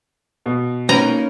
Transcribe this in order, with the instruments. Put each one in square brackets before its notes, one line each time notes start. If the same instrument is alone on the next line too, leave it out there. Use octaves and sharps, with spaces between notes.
[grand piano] B2
[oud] A#3 D#4 B4 [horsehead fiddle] C#4 [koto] A#5